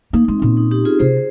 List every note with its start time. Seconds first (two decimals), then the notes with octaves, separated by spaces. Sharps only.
0.13 A#3 D#4
0.28 G#3 C4
0.42 A#2 C#4
0.57 D#4
0.71 D#4 G4
0.85 F4 G#4
0.99 C3 G#4 C5